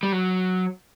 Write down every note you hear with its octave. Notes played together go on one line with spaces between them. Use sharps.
G3
F#3